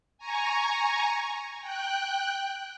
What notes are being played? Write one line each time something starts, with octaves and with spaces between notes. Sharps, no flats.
G#5 A#5 C#6
G5 F#6